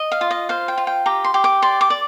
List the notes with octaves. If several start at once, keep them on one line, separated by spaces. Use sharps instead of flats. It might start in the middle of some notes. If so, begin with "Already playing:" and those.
Already playing: D#5
F5
F4
D#5
C5 F5
G5
F4
G5
G4 A#5
C6
G4
D6
D5 C6
D6
D5